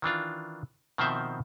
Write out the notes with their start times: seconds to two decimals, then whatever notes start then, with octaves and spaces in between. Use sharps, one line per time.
0.02 D#3 E3 D4 F4
0.98 B2 D#3 F3 C4 C5 E5